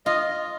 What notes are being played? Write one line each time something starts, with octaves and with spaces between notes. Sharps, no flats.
F4 D#5